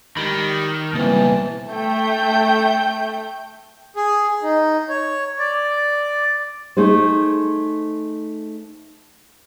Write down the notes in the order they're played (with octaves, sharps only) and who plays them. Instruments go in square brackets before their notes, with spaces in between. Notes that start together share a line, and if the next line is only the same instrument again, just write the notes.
[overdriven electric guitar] D#3 [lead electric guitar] G4 B5
[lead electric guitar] C#2 A#3 [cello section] B2 G3 C4 [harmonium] E3 A5
[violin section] A3 G5 G6
[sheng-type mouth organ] G#4
D#4
C#5
D5
[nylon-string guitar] A3 D#4 G#4 C5